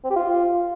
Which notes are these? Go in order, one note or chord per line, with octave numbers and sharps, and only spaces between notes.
C4
G4
F4